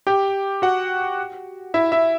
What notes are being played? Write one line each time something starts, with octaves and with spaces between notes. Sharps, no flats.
G4 G5
F#4 F#5
E4 E5
E4 E5